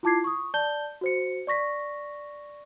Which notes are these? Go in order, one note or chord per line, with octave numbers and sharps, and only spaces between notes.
E4 F4 A5 D6 G#6 C7
C#6 D#6
D5 A5 G6 G7
F#4 C5 C#7
D5 C#6 A#6 B6